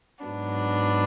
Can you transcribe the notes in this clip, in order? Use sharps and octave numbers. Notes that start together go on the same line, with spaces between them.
G#2 F#3 B3 D4